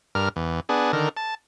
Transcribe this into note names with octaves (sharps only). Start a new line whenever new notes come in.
G2 A#4 F6
E2
B3 D4 G#4
D3 D#3 A#4
A5